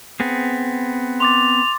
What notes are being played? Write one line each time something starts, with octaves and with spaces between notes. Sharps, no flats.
B3 C4 G#4
C6 D6 A6 F7